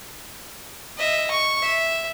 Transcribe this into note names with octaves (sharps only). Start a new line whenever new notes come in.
D#5 E5
C#6
E5